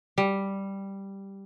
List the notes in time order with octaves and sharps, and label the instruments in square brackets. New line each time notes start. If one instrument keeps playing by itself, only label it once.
[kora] G3